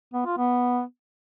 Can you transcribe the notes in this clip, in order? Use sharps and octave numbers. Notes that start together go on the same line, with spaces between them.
B3
F4
B3